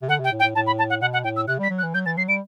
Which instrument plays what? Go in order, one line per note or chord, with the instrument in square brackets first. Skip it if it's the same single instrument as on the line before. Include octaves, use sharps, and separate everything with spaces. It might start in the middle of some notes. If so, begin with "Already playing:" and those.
[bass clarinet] C3
[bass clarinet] D3 [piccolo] F#5
[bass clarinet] C3 [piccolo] G5
[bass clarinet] A2
[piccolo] G5
[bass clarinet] A2
[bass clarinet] A2 [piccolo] A5
[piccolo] B5
A5
F#5
[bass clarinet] B2 [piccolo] F#5
[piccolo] F#5
[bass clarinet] A2 [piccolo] G5
[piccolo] E6
[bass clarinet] C3 [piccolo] F#6
[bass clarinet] G3 [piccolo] B6
[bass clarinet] F#3
[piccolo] F#6
[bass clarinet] E3
[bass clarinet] F#3 [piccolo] G6
[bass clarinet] E3 [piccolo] A6
[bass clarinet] F#3 [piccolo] C7
[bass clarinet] G3 [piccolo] D7